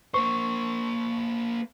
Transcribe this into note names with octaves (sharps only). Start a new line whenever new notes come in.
A#3 C5 C#6